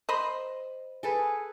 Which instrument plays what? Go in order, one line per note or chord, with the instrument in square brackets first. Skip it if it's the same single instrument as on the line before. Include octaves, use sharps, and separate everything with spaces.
[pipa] C5 D#5 B5
[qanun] G#4 A4 B4